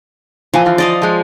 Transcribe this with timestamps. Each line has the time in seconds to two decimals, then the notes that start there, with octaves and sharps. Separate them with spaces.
0.54 A#2 E3 F3 G#5
0.65 D3 E3 F4
0.78 D5 D#5 F5
1.02 F3 G#3